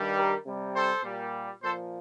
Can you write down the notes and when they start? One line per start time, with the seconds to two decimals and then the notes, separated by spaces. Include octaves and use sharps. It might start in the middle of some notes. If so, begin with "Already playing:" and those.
Already playing: G2 D#3 G3
0.16 G4 A#4
0.46 C3 G3
0.75 A4 C5
1.04 A#2 G3
1.62 A#2 F3 A4 C5